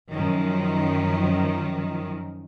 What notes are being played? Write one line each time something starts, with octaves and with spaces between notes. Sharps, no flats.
F#2 D#3 F3